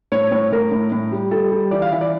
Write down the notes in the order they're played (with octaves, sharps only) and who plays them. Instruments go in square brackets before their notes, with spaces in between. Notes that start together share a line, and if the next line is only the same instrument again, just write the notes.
[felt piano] A2 C#5
A2 C#5
A2 A#4
A2
A2
G3
G3 A4
G3
E3 D5
F5
E3 E5
D5